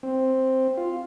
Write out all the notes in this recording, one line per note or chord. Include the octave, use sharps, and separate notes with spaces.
C4
F4